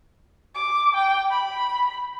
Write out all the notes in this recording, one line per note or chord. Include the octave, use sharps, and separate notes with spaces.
D6
G5
B5